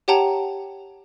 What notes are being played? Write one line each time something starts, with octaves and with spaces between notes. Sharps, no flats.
G4 C#5 F#5 G5 A5 A#5